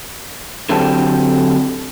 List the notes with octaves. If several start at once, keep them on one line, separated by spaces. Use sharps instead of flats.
D3 F#3 C4 D4 G4 A4